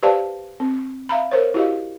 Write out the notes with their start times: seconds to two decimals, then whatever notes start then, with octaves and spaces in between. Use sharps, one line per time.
0.03 G4 B4 C5 D5 F5 A5
0.60 C4
1.09 E5 F5 A#5 B5
1.31 A#4 C5 C#5
1.54 E4 F#4 G4 D#5 F5